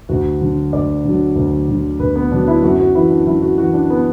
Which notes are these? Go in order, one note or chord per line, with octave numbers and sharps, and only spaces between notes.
D2 F#4
D3 F#3
D2 D5
D3 F#3
D2
D3 F#3
D2 B4
B3
D3 F#3 D4
E4
F#2 F#4
F#4
E3 E4
D4
F#2 E4
F#4
E3 F#4
D4
B3